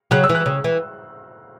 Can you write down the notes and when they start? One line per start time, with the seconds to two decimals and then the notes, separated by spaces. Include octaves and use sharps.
0.11 C#3 F#3 F#6
0.24 E6
0.29 E3
0.35 F#6
0.46 C#3
0.64 E3